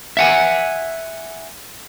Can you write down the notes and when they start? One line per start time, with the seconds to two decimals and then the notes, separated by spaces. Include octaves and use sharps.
0.17 E5 F#5 G#5